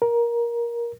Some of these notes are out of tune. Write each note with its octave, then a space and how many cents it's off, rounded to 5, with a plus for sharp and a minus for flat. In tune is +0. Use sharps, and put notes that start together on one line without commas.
A#4 +15